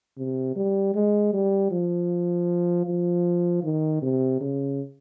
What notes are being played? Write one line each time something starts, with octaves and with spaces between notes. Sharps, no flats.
C3
G3
G#3
G3
F3
F3
D#3
C3
C#3